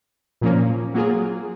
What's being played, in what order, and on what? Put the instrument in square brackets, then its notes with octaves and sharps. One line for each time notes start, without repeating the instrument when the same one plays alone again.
[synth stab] A#2 F3 A#3 C#4
F#3 A#3 F4 G#4